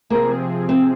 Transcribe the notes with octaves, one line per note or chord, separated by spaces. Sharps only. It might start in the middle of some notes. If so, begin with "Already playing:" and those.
C3 F3 A#3 C4 G#4
C4